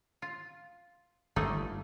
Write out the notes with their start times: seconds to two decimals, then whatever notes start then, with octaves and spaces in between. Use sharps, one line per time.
0.22 F4
1.36 G1 A3 A#3 D#4